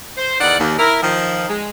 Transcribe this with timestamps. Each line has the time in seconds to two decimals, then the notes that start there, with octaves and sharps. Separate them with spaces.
0.17 C5
0.40 E2 D#3 D5 F#5
0.59 D#2
0.79 E4 A#4
1.01 D#3 F3
1.49 G#3